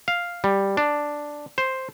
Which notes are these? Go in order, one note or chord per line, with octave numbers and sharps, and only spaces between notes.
F5
G3
D4
C5